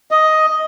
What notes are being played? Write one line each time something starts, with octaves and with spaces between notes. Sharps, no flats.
D#5